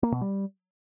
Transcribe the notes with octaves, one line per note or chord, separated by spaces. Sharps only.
A#3
B2
G3